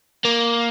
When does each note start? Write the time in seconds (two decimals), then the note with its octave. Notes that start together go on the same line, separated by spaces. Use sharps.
0.25 A#3